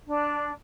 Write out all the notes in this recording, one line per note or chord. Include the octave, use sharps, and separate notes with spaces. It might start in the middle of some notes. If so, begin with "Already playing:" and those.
D4